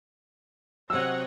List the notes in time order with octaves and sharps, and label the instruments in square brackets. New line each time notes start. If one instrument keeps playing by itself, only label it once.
[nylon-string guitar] C3 F#3 [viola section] C#5 D#5 F#5 [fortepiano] E6